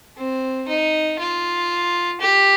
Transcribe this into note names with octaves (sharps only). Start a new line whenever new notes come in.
C4
D#4
F4
G4